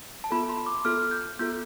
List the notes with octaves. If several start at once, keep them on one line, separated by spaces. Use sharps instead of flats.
A5
B3 F4 A4 B5
C6
D6
B3 F4 A4 F6
G6
B3 F4 A4 G6